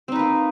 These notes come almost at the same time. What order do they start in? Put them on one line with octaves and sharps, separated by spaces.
C4 D#4 B4 A#3